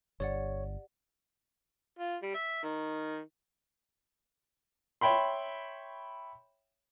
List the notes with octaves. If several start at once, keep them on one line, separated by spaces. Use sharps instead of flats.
G1 G4 C#5 D5 F#5
F4
G3
E5
D#3
C#5 E5 G5 B5 C6